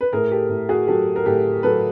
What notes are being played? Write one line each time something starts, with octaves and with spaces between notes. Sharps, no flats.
B4
A2 G#4 A#4
G4 A4
A2
F#4 G#4
F#3 G4 A4
A#4
A2 G4 A4
F#3 A4 B4